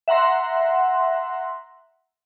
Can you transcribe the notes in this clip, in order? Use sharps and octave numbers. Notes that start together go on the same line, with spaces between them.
E5 F#5 A#5 C6 A#6